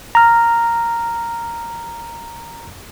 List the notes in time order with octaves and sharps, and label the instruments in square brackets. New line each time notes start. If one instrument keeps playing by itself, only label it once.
[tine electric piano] A#5 F6